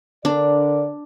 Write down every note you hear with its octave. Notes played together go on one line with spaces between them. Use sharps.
D3 D4 A#4 D5